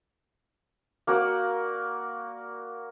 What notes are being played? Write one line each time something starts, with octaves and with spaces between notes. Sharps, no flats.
A#3 F#4 D5